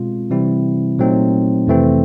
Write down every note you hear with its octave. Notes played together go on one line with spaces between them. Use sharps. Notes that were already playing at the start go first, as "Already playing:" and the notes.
Already playing: B2 G#3 C4 F4
C3 E3 G3 C4 E4
A#2 F#3 A3 C4 D#4
F2 C3 E3 A3 C4